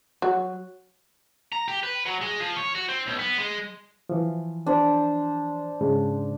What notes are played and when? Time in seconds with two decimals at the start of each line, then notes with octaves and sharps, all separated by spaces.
0.22 F#3
1.53 A#5
1.68 G4
1.83 B4
2.06 F#3
2.21 G#3
2.40 F3
2.57 C#5
2.75 F#4
2.89 C4
3.07 B1
3.19 B3
3.38 G#3
4.09 E3 F3
4.66 D4 C5
5.81 G#2 C#3 G#3